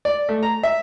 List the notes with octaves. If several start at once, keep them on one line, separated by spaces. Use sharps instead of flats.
D5
A3
A#5
E5